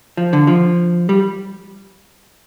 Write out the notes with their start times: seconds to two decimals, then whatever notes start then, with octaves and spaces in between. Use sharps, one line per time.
0.17 F3
0.33 D3
0.47 F3
1.09 G3